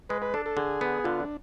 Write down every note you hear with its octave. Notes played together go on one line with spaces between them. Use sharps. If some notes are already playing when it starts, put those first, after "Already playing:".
G#3 B4
B4
D4 A4
A4
D3 G#4
B3
D3 F4
D4